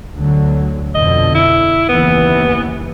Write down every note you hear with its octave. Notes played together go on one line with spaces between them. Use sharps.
D2 D3 F#3
F2 B2 D3 D#5
E4
F#1 D#2 E3 B3